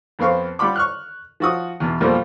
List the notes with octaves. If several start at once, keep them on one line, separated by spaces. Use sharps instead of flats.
F2 B3 C4 F5 C#6
G3 F4 F#5 B5 D6
C#6 F6 F#6
F3 F#4 D#6
E2 B2
F2 B2 F3 G3 A#3 C4